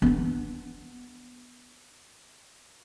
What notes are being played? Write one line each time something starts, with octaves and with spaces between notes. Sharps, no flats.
B3 D4